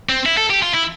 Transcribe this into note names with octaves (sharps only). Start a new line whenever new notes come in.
C4
E4
A4
G4
F4
E4